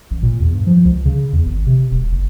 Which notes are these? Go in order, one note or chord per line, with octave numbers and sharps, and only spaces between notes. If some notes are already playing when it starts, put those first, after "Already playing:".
A1
A#2
E2
G2
F3
C#2
C#3
E2
G#1
C3
E1
F#1